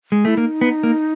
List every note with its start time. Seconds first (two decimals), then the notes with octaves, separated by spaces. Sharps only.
0.12 G#3
0.25 A3 E4
0.37 A#3 D#4
0.61 B3
0.83 A#3